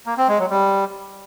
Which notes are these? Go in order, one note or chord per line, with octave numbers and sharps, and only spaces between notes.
A#3
C4
G#3
F#3
G3